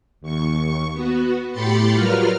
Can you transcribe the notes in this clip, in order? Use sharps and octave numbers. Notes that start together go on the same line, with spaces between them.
D#2 C#6
B3 F#4
A2 G4 B5 C6 A6 C#7
F#3 G3 F4 A#4 B4 F6